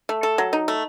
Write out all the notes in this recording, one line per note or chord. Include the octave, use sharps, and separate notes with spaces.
A3
A4
F#3
D#4
A3